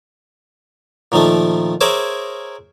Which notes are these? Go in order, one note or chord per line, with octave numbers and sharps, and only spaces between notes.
A#2 D#3 F3 A3
G#4 A#4 C5 C#5 E5 D6